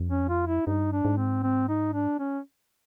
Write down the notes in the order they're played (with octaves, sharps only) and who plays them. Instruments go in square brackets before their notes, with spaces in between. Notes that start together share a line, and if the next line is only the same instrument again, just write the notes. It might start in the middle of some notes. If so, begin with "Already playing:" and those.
Already playing: [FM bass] F2
[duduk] C#4
F4
E4
[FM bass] G2 [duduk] D#4
[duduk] D4
[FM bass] G#2
[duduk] C4
C4
D#4
D4
C#4